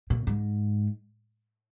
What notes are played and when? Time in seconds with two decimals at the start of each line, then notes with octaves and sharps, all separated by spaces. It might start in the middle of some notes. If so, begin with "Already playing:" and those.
0.10 A#2
0.27 G#2